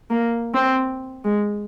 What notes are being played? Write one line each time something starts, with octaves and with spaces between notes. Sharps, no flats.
A#3
C4
G#3